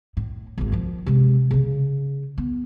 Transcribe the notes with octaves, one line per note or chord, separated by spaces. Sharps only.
A2
D#1 G#1
D#3 F3
C3 G#3
C#3 C#4
B3